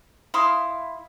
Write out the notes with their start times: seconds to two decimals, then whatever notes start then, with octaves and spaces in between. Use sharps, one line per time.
0.34 E4 F5 C6 D#6